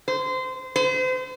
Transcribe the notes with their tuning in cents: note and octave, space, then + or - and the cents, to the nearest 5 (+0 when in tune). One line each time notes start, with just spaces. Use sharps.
C5 -25
C5 -35